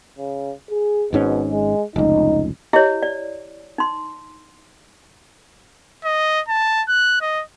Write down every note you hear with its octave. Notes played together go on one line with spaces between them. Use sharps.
C#3
G#4
G#1 G#2 B2 C#4
G#3
F1 C#2 D#4
E4 G4 C#5 D#5
D5
D#4 C6
D#5
A5
F#6
D#5